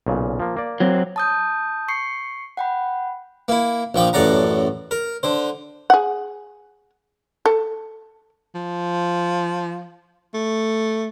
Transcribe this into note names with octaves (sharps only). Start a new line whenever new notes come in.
B1 A#2 C#3
F3 A#3
A#3 D5
F#3 C4
A5 D#6 G6
C#6 C7 C#7
F#5 G5 B5
A#3 E4
A#1 F3 G5 D6
A1 F#2 A4 D5 F#5 A#5
A#4
D3 C5
G#4 F#5
A4
F3
A3